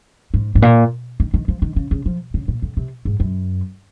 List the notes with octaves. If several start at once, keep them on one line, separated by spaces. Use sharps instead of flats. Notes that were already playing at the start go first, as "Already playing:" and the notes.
G#2
G#2
A#2
D#3
D#3
F3
D#3
C#3
C#3
F3
C#3
A#2
F2
C3
G#2
F#2